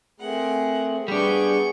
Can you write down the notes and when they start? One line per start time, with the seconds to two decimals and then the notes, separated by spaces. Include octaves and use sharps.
0.20 A3 C4 G#4 A#4 F#5
1.08 G3 B3 D4 G#4 C#6 G6